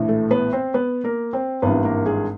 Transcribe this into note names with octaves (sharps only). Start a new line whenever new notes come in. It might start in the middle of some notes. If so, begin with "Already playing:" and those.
Already playing: A#1 A2 E3
A3 A4
B3 B4
C4 C5
B3 B4
A#3 A#4
C4 C5
G#1 G2 E3 B3 B4
A#3 A#4
G#3 G#4